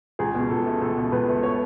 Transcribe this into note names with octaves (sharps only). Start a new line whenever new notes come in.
C#2 G#4
B2
C#2 A4
A3
C#2 A4
B2
C#2 B4
A3
C#5